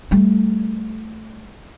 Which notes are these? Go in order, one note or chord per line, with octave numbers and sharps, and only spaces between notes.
G3 A3